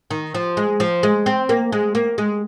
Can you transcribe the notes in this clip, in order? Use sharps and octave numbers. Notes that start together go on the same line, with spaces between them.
D#3
F3
G#3
F3
G#3
C4
A#3
G#3
A#3
G#3